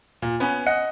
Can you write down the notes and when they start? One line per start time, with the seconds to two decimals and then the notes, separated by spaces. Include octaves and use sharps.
0.22 A#2
0.40 B3 C#4 B4
0.66 D#5 F#5 F#6 C#7